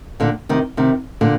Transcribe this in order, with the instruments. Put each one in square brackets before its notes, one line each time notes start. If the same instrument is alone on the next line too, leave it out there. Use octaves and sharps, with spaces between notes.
[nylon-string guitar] A#2 D3
C3 D#3
C3 D#3
A#2 D3